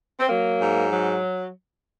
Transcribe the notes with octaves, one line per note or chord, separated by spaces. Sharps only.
C4
F#3 A#3
G#2
F#3